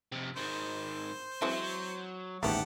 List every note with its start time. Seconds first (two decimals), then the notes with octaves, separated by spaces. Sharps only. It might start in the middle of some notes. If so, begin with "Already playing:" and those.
0.12 F2 C3
0.36 G#2 D#3 C5
1.42 E3 F#3 G#3 C4
2.43 A1 D#2 G#2 A3 B3 G4 F#5 A5